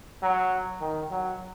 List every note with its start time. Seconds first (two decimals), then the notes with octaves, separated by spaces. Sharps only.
0.22 F#3
0.81 D#3
1.11 F#3